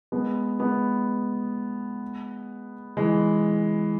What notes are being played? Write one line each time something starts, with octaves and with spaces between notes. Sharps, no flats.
G#3 B3
G#3 B3
E3 G#3